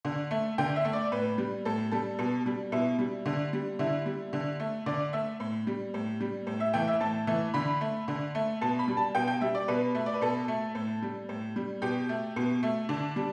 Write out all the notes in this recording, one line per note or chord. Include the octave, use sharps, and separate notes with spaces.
D3
A3
D3 G5
E5
A3
D5
A2 B4
G3
A2 A4
G3 A4
B2
G3
B2 E4
G3
D3
G3
D3 E4
G3
D3
A3
D3 D5
A3 E5
A2
G3
A2
G3
A2
E5
E3 A3 G5
E5
A2 A5
E3 A3
D3 B5
A3
D3
A3
B2 A5
B5
G3
A5
B2 G5
G5
G3 E5
D5
B2 B4
A3
D5
B4
B2 A4
A3
A2
G3
A2
G3
B2 G4
A3
B2
A3
D3 D4
G3